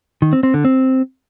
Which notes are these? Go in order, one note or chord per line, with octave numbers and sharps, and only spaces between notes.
D#3
C4
C4
D3
C4